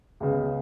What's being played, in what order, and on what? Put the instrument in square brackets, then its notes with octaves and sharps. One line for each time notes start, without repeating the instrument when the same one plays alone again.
[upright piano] C#2 C#3 B3